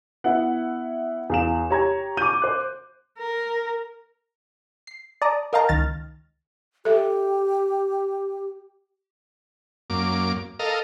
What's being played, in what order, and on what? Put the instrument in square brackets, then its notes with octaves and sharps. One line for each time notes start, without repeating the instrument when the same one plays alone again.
[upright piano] B3 E4 [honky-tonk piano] F#5
[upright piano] E2 F5 E7
[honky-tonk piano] G4 [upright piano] C#5 A#5 G#6
[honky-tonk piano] D6 D#7 [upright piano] G6
[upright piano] C5 F#6
[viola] A#4
[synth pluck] C7
D5 A5 A#5 D#6
A#4 D#5 F5 G5 A5 A#5
C#2 D#3 F6 A6 A#6
[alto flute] G4 [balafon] A4 E5
[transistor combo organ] F#2 A#3 D6
A4 A#4 D#5 F5